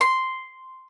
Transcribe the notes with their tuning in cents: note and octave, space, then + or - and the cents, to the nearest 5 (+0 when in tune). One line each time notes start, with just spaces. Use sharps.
C6 -5